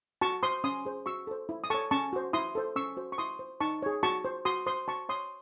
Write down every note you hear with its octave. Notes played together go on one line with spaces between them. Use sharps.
F#4 A5 C#6
C5 C6 D#6
C#4 C6 D#6
G#4 C5
F#4 C#6 E6
A4 C5
E4
D#6
A4 C#5 A5 C#6
C#4 A5 C#6
F#4 C5
E4 C6 D#6
A4 C5
C#4 C#6 E6
F#4 C5
C#6
E4 C6 D#6
C5
D#4 A5 C#6
G#4 C#5
F#4 A5 C#6
C5
F#4 C6 D#6
C5 C6 D#6
F#4 A5 C#6
C#5 C6 D#6